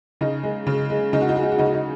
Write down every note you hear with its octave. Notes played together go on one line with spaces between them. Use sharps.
C#3 D#4
G#3
C#3
G#3
C#3 D#4
F#4
D#4
G#3 F#4
D#4
F#4
C#3 D#4
F#4
D#4